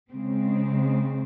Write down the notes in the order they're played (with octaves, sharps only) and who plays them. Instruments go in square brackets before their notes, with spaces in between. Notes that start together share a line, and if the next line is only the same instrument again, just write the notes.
[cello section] C#3 G#3 C4